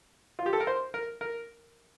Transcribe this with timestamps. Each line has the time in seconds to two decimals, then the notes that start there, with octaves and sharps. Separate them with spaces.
0.39 F4
0.46 G4
0.53 A4
0.60 A#4
0.67 C5
0.94 A#4
1.21 A#4